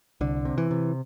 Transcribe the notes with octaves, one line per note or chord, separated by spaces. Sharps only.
C2 D3
C3
E3
C3